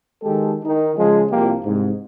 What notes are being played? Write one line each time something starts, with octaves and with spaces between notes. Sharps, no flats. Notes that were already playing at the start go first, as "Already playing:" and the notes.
D#3 G#3 G4 A4
D#3 D#4
C#3 F3 G#3
C2 F3 A#3 F4 G4
C2 G#2